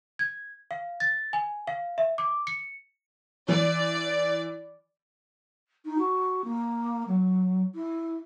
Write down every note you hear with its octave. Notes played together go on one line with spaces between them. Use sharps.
G#6
F5
A6
G#5
F5
E5
D6
C#7
E3 D5
D#4
F#4
A#3
F#3
E4